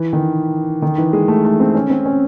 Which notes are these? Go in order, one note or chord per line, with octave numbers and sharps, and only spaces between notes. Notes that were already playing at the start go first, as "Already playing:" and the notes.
Already playing: E3
D#3
D#3
E3
G#3
A3
A3
C4
C#4
C4
C#4